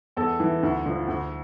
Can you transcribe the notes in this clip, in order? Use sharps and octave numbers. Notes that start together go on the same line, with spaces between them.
E2 A4
E3
D2
D3 F3
D2